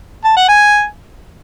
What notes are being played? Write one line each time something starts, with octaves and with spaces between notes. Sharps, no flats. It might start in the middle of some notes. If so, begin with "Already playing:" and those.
A5
F#5
G#5